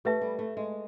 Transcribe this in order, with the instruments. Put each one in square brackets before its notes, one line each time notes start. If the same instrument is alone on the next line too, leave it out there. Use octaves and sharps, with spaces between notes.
[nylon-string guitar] A3 [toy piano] G4 B4 E5 A5
[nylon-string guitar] G3
A3
G#3